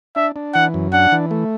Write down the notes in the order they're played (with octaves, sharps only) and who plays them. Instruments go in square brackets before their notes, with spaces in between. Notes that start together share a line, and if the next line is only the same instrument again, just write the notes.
[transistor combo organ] D4 [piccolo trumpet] E5
[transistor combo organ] D4
[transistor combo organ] E3 [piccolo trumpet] F#5
[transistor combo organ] F#2
[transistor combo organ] D4 [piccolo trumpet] F#5
[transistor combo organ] E3
A3